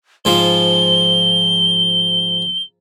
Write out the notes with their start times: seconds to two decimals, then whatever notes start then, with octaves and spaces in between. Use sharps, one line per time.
0.25 G#2 F3 G7